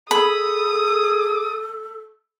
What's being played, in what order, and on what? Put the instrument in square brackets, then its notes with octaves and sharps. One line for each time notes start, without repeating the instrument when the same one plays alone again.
[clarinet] G#4 [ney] A4 [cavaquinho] B5 [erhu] D#6